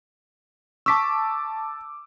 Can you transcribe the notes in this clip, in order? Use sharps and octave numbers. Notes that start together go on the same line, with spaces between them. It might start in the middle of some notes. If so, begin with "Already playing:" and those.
A5 C#6 D6 E6 B6